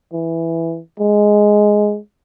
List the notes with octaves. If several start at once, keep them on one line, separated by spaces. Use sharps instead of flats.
E3
G#3